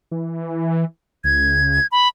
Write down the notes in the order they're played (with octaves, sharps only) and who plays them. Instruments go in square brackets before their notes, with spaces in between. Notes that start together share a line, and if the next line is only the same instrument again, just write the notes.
[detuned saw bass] E3
[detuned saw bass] C#2 [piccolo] G#6
[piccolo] B5